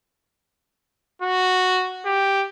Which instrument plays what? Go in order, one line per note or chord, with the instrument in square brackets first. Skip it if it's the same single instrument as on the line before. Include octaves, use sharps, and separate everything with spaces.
[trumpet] F#4
G4